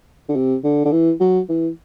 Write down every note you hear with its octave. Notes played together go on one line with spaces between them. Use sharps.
D3
C3
D3
D3
E3
F#3
E3